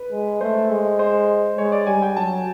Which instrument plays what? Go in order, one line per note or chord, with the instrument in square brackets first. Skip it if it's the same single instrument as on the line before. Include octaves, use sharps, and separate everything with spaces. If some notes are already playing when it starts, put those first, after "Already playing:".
Already playing: [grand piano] B4
[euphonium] G#3
[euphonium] A3 [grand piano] C5
[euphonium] G#3
[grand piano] C5
[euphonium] G#3 [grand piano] C#5
[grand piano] D5
[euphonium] G3 [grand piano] G#5
[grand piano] G5
[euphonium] F#3 [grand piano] A5